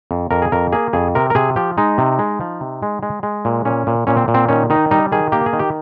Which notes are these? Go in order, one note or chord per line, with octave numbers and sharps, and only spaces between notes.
F2
F2 A#4
G#4
F2 A#4
A#3 G#4
F2 G#4
C3 A#4
A#4
C3 G#4
F3 G4
G#3 D#4
C3
G#3
F3
C3
G#3
G#3
G#3
A#2
A#2 C#4
A#2
A#2 C#4
C4
A#2
C4
D#3 C#4
D#3 D#4
G3 D#4
D#3 G#4
A#3 G4
G#4
D#3
G4